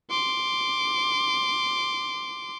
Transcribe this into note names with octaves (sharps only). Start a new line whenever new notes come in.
C6 D6